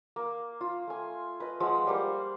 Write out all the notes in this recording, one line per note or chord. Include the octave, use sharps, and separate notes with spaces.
A#3
F4
A3 G#5
B4 D#5
F3 G#3 F#5 E6
G3 A#3 C5 C6